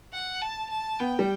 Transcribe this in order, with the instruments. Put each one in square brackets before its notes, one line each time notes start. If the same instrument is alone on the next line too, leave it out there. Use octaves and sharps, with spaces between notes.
[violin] F#5
A5
A5
[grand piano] B3 [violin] G5
[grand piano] G3